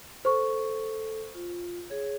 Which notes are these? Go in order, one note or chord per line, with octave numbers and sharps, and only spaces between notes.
A4 C5 C#6
F4
G#4 C#5